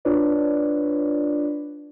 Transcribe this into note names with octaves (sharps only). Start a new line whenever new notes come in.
D4 F4 B4 C#5 D5